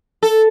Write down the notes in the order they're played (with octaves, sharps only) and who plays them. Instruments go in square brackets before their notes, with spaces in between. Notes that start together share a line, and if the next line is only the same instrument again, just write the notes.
[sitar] A4